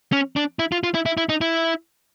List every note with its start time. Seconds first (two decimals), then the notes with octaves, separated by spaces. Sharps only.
0.12 C#4
0.36 D4
0.59 E4
0.72 F4
0.83 F4
0.94 E4
1.06 E4
1.17 E4
1.29 D#4
1.41 E4